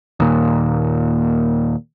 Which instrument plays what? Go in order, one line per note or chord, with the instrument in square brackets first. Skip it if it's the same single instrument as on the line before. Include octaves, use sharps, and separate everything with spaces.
[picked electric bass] D#2 A#2